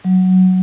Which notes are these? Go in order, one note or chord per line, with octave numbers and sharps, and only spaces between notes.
F#3